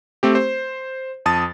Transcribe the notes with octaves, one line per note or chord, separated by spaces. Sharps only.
A3 C4 G4
C5
F2 A5 D#6 A6